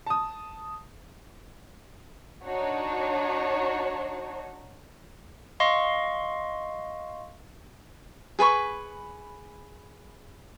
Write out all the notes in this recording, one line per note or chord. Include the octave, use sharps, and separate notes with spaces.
A5 D#6
D4 D#4 F#4 C#5
D#5 F5 C6 C#6
G#4 B4 B5 C#6